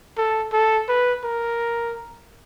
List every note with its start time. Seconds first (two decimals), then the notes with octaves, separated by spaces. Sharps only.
0.17 A4
0.53 A4
0.88 B4
1.24 A#4